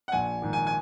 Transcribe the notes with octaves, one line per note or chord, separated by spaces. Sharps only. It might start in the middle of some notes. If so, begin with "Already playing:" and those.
F#5
A#1 G#5
G#2 D#3
G#5
G#5